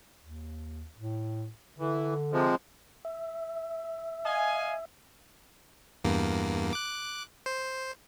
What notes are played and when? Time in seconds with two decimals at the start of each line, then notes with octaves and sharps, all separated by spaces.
0.23 D#2
0.98 A2
1.78 D3 E3
2.32 C3 F3 G#3
3.05 E5
4.24 D#5 F5 G#5
6.04 E2 G2 A#3
6.73 D6 F#6
7.46 C5